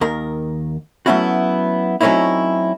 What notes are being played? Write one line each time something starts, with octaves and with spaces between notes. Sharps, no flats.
D#2 D#3 A#4
F#3 A3 B3 C#4 E4 F#4
F#3 A3 C4 C#4 D#4 E4